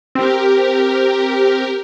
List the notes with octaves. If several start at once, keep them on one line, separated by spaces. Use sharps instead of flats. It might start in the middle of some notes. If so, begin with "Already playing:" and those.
C4 G4 A#4